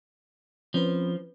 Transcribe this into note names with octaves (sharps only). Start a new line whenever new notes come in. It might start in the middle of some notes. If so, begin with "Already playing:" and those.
F3 C4 C#4 B4